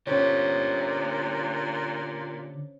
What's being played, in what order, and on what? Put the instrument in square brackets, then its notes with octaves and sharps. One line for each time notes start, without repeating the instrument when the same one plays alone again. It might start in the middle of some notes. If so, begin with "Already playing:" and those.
[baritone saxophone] A#2 [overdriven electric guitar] D3 G4 [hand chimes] C#4 C5 C#5